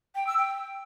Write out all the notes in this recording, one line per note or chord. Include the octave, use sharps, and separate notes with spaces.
G5
E6
G5